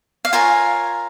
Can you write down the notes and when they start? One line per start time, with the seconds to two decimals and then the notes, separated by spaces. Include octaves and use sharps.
0.25 F5
0.33 F4 A#4 C#5 G#5